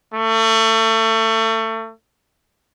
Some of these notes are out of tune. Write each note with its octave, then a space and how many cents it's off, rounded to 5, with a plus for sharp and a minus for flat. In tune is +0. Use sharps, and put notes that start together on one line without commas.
A3 +30